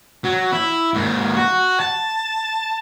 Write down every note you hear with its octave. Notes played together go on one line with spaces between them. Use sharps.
F#3
E4
G#2 A#3
F#4
A5